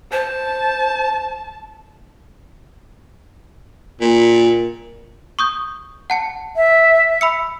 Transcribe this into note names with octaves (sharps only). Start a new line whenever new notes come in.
C5 A5
A#2
C#6 D#6 G6
F#5 A5 C#7
E5
B5 E6 C#7